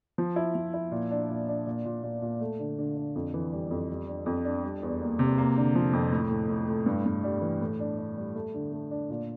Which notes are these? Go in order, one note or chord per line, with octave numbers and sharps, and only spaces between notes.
F3
E4
F3
E4
A#2
D4
A#2
D4
A#2
A#2
A#2
A#2
A3
D3
D3
D3
F2
E3
G3
F2
G3
D4
F2
D4
G3
E2
A#3
C3
A#3
D3
F3
F2
A2
A2
A2
A2
G2
G2
G3
E3
A2
D4
D4
G3
A3
D3
A3
D4
A#2